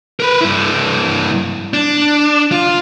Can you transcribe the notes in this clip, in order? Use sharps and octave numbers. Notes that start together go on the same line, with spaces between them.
A#4 B4
G2 E4
D4
F4